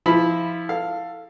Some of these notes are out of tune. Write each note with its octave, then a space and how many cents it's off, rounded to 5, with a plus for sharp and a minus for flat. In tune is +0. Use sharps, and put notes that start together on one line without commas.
F3 -20 E4 -15 B5 +0
A4 +10 F5 +0